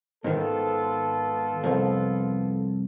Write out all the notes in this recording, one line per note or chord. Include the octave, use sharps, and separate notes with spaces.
G#2 D#3 B3 F4 A4
C2 F2